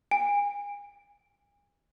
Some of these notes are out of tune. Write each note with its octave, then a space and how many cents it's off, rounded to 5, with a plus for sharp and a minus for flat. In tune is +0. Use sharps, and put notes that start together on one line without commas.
G#5 -35